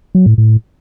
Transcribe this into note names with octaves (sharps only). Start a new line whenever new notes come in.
F#3
A2
A2